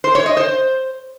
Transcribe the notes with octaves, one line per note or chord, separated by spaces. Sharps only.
C5
C#5
D#5
C5